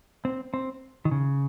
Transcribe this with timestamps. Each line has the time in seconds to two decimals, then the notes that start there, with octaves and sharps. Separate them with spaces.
0.25 C4
0.54 C4
1.05 D#3
1.11 C#3